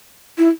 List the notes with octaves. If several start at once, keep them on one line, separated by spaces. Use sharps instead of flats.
E4